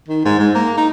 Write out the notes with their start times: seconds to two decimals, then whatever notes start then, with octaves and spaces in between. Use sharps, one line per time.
0.08 D#3
0.25 G#2
0.39 G#2
0.55 A#3
0.77 D#4